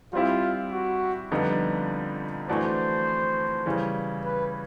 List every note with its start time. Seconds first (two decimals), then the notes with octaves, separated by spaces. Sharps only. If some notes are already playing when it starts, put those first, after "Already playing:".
0.13 G3 C4 E4 F4 G4
0.72 F#4
1.31 F2 D3 G3 B3 D#4
2.48 E3 A3 D4 F#4 C5
3.66 C#3 E3 G3
4.25 B4